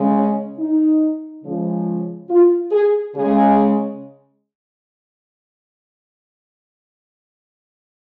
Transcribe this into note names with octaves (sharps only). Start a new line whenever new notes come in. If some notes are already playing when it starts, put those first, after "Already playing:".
Already playing: C#3 G#3
C#4
D#4
C#3 F3 G#3
F4
G#4
C#3 G#3 G#4